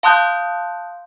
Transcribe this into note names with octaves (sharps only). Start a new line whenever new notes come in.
F5 A5 C6 D#6 F#6 G6